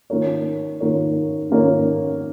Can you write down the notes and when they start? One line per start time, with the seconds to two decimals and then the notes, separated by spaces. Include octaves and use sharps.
0.10 D#3 A#3 F4 A#4 C#5
0.80 D#3 A#3 F4 A#4 C#5
1.50 D#3 A#3 F4 A#4 C#5